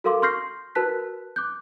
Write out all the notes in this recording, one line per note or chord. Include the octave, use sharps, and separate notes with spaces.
F#4 A4 A#4 F5 C6 D6
C6 C#6 F6 G6 A#6 C7
F#4 A#4 B4 A5 F#6 B6
D6 F#6 G6